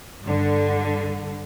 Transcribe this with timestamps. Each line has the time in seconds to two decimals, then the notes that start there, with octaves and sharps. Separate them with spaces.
0.22 G2 D3